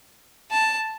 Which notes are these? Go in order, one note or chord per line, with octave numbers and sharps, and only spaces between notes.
A5